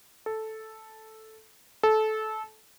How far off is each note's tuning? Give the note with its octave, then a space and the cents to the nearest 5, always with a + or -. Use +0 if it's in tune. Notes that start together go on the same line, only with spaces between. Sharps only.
A4 -5
A4 -20